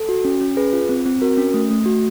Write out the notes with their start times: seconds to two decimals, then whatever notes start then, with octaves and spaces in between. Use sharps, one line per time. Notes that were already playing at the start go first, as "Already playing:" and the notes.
Already playing: A4
0.09 F#4
0.25 C#4
0.41 C#4
0.57 G#4 B4
0.73 F4
0.89 C4
1.06 C4
1.22 F#4 A#4
1.37 C#4
1.54 A3
1.70 A3
1.86 F#4